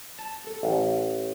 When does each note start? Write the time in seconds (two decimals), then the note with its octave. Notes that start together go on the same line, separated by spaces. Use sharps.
0.19 A5
0.47 A4
0.63 A1